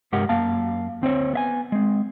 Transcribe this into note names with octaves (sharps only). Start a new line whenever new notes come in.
C2 G2 G#3 G4 A#4 F#5
F#2 A#3 F5 A5
D2 C4 C5 C#5
B3 E5 G#5
G#3 C4